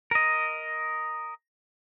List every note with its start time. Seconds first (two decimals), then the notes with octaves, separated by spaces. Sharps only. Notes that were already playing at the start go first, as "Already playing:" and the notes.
0.11 A#4 D#5